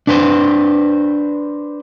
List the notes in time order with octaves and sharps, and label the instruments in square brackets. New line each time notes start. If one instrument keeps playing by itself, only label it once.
[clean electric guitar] D4 B4 C5